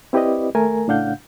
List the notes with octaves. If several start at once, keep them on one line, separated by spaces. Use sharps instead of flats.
C4 E4 G4 B4 D5 D#5
D#2 A3 A#4 G#5 A#5
A2 C#3 D4 F5 F#5 G6